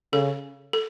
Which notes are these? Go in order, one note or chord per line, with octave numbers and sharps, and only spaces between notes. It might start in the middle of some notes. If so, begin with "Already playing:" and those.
C#3 A4
A4